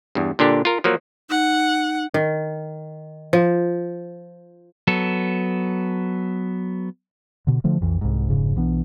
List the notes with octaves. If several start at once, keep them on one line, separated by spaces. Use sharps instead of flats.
E2 G2
A#2 D3 D4 G4
F4 A#4
F3 F#3 A#3
D#4 F#5
D#3
F3
F#3 B3 A4
B2 D3
D3 F3 A3
B1 F2 E3
C2 G#2
F1 G#2 C#3
B1 E3 B3 D4